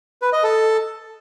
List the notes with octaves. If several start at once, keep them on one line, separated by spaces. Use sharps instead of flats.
B4
D#5
A4